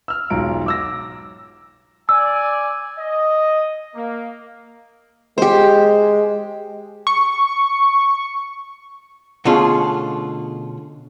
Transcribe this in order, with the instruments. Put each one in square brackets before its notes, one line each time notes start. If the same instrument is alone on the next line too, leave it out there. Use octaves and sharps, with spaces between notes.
[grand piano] E6 F6
E1 B1 G#2 F4 A#5 D7
D6 E6 A#6
[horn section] D5 G#5 [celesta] E6
[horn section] D#5
A#3
[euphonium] G#3 [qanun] G4 C5
[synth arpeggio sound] C#6
[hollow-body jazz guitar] B2 D3 A3 C#4 F4 G#4